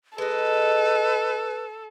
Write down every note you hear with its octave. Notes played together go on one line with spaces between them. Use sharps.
G#3 D#4 A4 B4